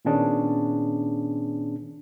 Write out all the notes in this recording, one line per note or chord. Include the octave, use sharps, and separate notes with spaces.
A#2 D#3 B3 C#4 D4 G#4